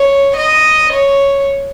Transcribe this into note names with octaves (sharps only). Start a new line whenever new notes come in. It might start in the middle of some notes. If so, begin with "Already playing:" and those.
Already playing: C#5
D#5
C#5